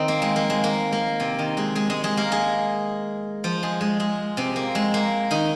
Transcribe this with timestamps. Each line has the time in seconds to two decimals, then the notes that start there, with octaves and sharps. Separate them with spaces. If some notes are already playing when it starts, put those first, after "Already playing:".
Already playing: D#3 C4 D#4
0.08 A#3
0.22 G#3
0.36 A#3
0.50 G#3
0.64 A#3
0.92 A#3
1.20 C3 C4
1.39 D#3 D#4
1.57 G#3 G#4
1.75 G#3 G#4
1.90 G#3 G#4
2.04 G#3 G#4
2.17 A#3 A#4
2.32 G#3 G#4
3.44 F3 F4
3.63 G#3 G#4
3.81 G#3 G#4
4.00 G#3 G#4
4.37 C3 C4
4.56 A#3
4.75 G#3
4.94 A#3
5.31 D#3 D#4